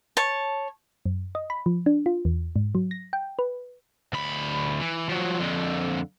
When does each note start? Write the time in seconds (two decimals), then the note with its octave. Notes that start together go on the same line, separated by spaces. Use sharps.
0.17 C#5 A5
1.06 F#2
1.35 D#5
1.50 B5
1.66 F3
1.86 D4
2.06 F4
2.25 E2
2.56 G#2
2.75 F#3
2.91 A#6
3.13 G5
3.39 B4
4.13 D2 B5
4.81 E3
5.10 F3 F#3
5.40 F2 D3